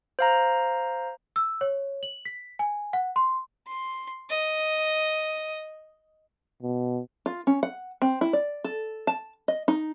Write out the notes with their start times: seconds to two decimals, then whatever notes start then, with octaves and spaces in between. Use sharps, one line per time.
0.19 C5 F5 A#5
1.36 E6
1.61 C#5
2.03 F#7
2.25 B6
2.59 G#5
2.93 F#5
3.16 C6
3.68 C6
4.30 D#5
6.62 B2
7.26 F4
7.47 C#4
7.63 F#5
8.02 C4
8.21 E4
8.33 D5
8.64 A4
9.07 A5
9.48 D#5
9.68 D#4